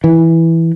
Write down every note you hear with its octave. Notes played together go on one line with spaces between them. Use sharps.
E3